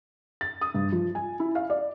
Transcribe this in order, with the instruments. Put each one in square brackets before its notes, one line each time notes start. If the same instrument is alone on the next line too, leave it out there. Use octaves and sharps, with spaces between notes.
[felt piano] A6
D#6
G2
F3
G#5
E4
F5
D5